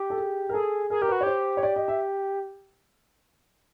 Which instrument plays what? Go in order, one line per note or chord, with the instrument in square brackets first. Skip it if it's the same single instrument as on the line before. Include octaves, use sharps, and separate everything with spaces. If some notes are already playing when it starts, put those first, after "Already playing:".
Already playing: [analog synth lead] G4
[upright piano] A4
G#4
A#4
[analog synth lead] G#4 [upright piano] A4
[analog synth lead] G#4 [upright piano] A#4
[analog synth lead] G4 [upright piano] A#4
[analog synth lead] F#4 [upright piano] B4
[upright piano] C#5
[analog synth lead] G4 [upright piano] C5
[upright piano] C#5
D5
D#5
E5